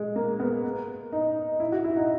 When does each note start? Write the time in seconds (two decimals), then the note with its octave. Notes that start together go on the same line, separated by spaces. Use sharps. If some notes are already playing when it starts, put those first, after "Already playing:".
Already playing: G#3
0.16 A#3
0.39 B3
1.13 D#4
1.60 E4
1.72 F#4
1.84 E4
1.96 D#4